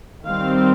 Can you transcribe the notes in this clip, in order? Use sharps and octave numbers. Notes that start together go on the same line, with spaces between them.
D#3 G3 C4 F5